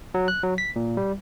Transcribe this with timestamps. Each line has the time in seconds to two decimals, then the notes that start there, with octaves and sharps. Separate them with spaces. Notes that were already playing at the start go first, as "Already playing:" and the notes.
0.14 F#3
0.28 F#6
0.43 F#3
0.58 B6
0.76 A#2
0.97 G3